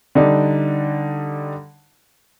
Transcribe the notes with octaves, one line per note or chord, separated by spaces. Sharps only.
D3 G3 D4 D#4